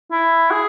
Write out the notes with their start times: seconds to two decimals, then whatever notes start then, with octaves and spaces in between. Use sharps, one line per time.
0.12 E4
0.51 G#4